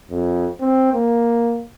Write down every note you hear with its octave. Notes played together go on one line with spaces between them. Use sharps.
F2
C4
A#3